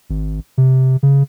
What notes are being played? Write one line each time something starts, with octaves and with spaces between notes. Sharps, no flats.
G#1
C3
C#3